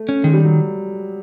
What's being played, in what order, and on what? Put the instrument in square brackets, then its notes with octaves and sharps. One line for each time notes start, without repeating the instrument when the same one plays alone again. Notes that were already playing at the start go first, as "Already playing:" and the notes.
Already playing: [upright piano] A3
[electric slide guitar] C#4
[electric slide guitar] D#3 [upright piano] G#3
[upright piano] G3
F#3